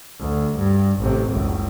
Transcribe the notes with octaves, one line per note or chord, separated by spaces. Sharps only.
D2
G2
A1 C3
F#1 C#2